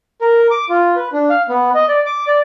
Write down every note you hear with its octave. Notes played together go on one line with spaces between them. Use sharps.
A#4
D6
F4
B4
D4
F5
B3
D#5
D5
D6
D5